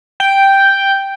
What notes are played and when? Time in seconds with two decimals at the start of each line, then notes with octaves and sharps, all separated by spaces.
0.20 G5